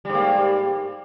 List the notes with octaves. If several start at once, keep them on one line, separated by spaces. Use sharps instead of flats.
G#2 G3 A#3